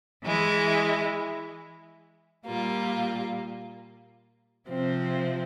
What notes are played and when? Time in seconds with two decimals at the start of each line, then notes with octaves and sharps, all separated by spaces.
0.24 E3 G#3 E4
2.46 A#2 G3 A#3 F4
4.68 C3 F3 C4